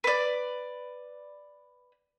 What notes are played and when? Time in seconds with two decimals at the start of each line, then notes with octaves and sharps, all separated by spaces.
0.04 B4 D5